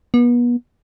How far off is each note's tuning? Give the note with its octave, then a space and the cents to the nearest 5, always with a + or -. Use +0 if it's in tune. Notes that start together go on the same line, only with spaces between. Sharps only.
B3 -35